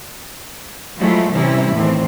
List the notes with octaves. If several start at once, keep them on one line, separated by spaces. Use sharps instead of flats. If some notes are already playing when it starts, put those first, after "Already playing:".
F3 F#3 G#3 A3 E4 F4
A2 C3 E3 G3 C#4 E4
E2 A2 D#3 E3 C4